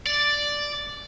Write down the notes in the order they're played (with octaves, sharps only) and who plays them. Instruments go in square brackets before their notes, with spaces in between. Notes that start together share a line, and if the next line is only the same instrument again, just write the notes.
[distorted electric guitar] D5